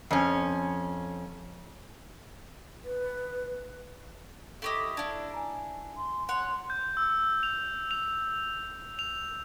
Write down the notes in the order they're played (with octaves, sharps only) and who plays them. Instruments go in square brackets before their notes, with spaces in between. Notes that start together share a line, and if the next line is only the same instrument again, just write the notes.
[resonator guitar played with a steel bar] F2 C#4
[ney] B4
[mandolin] E4 G4 D#5 [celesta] A4 C#6 D6
[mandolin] D4 E4 [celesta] D5 G#6
[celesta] G#5 A#5
[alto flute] C6
[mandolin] C#5 F#5 [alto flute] C6
[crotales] G6
E6
F7
F7
F7